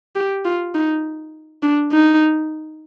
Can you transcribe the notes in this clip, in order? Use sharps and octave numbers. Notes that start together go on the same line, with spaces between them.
G4
F4
D#4
D4
D#4